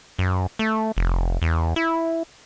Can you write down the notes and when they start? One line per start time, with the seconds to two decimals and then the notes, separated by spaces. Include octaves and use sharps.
0.19 F#2
0.59 A3
0.97 F1
1.42 E2
1.76 E4